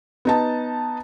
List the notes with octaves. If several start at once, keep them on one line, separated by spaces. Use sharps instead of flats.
B3 D#4 A5